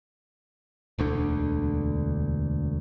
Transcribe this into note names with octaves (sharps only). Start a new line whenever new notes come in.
E1 D2 D3